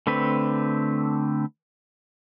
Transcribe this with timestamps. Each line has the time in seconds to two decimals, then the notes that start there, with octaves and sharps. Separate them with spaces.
0.07 D3 A3 C4 B4